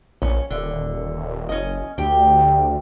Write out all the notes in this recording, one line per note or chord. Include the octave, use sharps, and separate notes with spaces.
A#1 C#4
D#1 D3
F#1 C#4 D#5
D2 G4